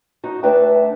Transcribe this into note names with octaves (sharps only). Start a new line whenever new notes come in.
D#4 F#4
D2 A3 D4 B4 E5 G5